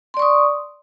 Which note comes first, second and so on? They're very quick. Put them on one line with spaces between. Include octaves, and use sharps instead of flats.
C6 D5 C#6 D#6